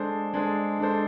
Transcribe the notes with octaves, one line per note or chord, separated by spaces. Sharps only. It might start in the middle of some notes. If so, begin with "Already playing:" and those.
Already playing: G#3 D4 A4 C5
G#3 D4 A4 C5
G#3 D4 A4 C5